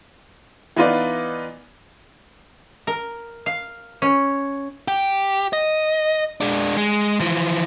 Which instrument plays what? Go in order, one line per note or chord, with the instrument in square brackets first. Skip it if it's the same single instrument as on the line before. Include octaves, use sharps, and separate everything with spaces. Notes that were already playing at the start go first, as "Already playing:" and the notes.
[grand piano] E3 B3 D#4 F4 B4 D5
[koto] A#4
F5
C#4
[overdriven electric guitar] G4
D#5
G#3 D4
G#3
E3 F3